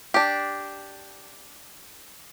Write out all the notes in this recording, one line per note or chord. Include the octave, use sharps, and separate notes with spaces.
D4 G4